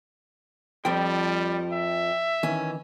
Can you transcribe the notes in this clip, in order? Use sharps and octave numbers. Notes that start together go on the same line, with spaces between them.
F2 F3 G3 G5
E5
D#3 E3 C#4